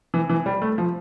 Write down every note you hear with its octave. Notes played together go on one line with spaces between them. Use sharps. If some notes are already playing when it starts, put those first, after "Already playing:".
E3
E3
G3
A3
F3